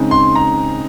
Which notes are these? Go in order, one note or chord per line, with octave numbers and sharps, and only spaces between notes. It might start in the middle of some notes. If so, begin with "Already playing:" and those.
Already playing: C#3 G#3 C4 D#4
C6
A#5